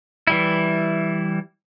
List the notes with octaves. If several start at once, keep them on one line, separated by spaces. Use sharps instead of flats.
E3 G3 E4